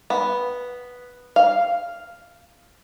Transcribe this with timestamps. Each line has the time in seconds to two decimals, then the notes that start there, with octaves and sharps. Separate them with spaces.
0.10 B3
1.36 F5